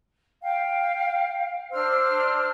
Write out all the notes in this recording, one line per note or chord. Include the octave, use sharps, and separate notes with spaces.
F5 G5
D4 C5 E6 F6